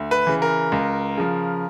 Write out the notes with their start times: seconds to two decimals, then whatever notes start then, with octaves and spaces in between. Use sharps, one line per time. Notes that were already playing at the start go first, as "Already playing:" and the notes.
Already playing: D2
0.11 B4
0.27 C#3 E3
0.42 A#4
0.72 C#2
1.18 C#3 F3